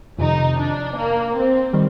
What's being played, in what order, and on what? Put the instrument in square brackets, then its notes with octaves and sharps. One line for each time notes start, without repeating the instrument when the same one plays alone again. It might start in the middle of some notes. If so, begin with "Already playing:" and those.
[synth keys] F2 C3 D#3 [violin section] D#4
[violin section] D4
A#3
C4
[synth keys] D#3 G3